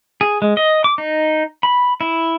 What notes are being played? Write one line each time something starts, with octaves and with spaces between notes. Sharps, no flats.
G#4
G#3
D#5
D6
D#4
B5
E4